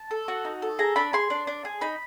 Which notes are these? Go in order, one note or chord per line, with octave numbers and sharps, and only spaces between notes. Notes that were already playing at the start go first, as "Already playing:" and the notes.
Already playing: A5
A4
F#4
D#4
A4
G#4 A#5
D4 B5
G#4 C6
D4
D4
G#4
D#4 B5